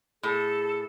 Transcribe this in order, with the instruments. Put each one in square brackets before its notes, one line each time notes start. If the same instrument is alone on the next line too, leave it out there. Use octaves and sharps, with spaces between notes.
[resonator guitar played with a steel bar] A2 [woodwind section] G#4 A4